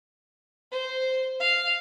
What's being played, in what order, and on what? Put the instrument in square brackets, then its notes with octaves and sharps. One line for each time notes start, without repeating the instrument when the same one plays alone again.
[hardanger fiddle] C5
F5